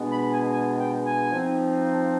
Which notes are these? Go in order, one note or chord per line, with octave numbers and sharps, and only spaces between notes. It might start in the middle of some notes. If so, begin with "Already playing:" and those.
Already playing: B2 G#3 B3 D4
B5
G#5
G#5
G5
G#5
F3 C4 D#4